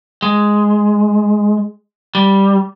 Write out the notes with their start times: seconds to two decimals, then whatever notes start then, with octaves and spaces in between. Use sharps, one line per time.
0.22 G#3
2.15 G3